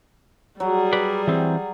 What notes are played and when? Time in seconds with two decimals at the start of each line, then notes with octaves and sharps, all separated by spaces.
0.60 F#3 G3 G#4
0.93 B4 D5
1.27 E3 C4